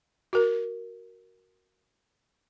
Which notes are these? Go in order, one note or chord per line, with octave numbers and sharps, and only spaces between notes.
F#4 A#4